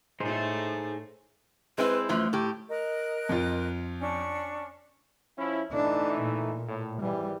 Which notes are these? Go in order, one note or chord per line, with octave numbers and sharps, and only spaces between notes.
A2 A3 D#4 G#4 C5
G#3 C4 E4 B4
F#2 E3 F3 A3
A2 G4
A#4 D#5 F#6
F2 F4
C#4 D4 C#6
F3 C#4 E4
E3 A3 D4 D#4
A#2
A2
G#1 E3 G3